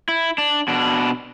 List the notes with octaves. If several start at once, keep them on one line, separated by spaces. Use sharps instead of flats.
E4
D4
B2 D4